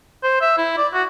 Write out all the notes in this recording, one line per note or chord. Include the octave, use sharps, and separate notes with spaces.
C5
E5
E4
D5
F#4